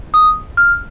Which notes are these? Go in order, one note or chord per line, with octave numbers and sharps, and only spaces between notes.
D#6
F6